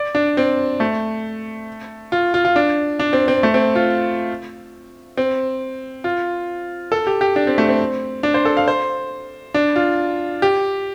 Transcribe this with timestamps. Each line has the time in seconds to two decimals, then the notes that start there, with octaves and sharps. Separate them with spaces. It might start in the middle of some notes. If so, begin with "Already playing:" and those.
Already playing: D5
0.15 D4
0.37 C4
0.80 A3
2.12 F4
2.34 F4
2.45 F4
2.56 D4
2.99 D4
3.13 C4
3.28 C4
3.43 A3
3.54 C4
3.75 F4
5.17 C4
6.04 F4
6.92 A4
7.07 G4
7.21 G4
7.36 D4
7.47 C4
7.58 A3
7.69 C4
8.23 D4
8.34 C5
8.45 A4
8.57 F5
8.68 C5
9.54 D4
9.76 F4
10.42 G4